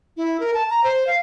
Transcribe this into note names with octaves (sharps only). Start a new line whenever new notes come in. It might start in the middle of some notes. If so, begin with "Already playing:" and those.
E4
A#4
A5
A#5
C5
F5